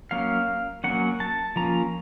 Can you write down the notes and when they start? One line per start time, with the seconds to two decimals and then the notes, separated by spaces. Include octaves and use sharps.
0.11 F#3 A#3 C#4 F5
0.84 F#3 A#3 C#4 F#5
1.20 A5
1.56 F3 A#3 C#4 A#5